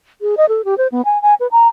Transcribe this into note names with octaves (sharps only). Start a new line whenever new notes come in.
G#4
D#5
A4
G4
C5
B3
G#5
G#5
B4
A#5